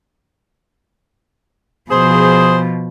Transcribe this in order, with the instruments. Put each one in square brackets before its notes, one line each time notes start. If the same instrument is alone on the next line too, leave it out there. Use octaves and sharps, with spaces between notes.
[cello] B2 F3 [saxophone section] G#4 C5